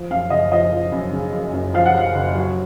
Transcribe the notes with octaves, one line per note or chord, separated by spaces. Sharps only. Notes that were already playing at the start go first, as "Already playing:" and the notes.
Already playing: F3
F#2 F5
F#1 D#5
F3 D#5
F3
F#2
C#3
F#1
F#2
F3 F5
F#5
F3 F5
F#1
F#3